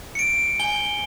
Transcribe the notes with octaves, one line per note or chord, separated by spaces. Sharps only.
C#7 D7
G#5 G7